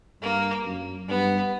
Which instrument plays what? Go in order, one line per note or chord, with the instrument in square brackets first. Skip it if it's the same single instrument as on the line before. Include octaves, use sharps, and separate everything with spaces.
[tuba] G2 [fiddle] A#3
[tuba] F#2
[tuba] G2 [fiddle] B3